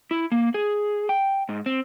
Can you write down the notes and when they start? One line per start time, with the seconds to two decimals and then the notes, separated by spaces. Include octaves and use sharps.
0.11 E4
0.32 A#3
0.54 G#4
1.09 G5
1.49 G#2
1.66 C4